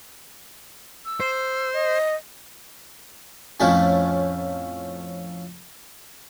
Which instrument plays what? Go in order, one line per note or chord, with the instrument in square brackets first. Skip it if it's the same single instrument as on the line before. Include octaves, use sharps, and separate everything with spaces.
[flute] E6
[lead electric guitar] C5
[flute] D#5
[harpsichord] F2 A2 F3 A3 C#4